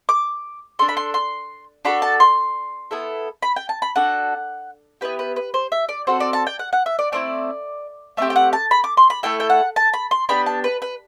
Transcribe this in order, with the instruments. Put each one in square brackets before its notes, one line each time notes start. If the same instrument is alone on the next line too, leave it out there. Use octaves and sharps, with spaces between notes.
[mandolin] D6
D4 A4 C6
B5
C6
C6
D4 F#4 A4 B5
A5
C6
B3 E4 A4
B5
G5
A5
B5
D4 F#4 A4 F#5
B3 E4 G4 B4
B4
B4
C5
E5
D5
C4 F#4 A4 C5
D5
A5
G5
F#5
F#5
E5
D5
A3 C4 E4 D5
A3 C4 G4 E5
G5
F#5
A5
B5
D6
C6
B5
A3 E4 A4 G5
G5
F#5
A5
B5
C6
B3 D4 G4 B5
A5
B4
B4